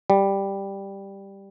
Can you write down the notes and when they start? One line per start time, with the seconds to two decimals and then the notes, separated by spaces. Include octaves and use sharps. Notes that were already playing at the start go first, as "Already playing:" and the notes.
0.10 G3